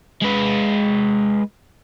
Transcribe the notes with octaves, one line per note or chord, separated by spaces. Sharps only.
G#3 B4